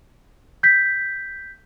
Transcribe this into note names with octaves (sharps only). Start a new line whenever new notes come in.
G6 B6